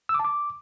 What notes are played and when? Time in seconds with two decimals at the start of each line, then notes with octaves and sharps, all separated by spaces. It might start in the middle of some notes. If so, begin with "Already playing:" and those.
0.09 E6
0.14 D6
0.19 A5
0.25 D6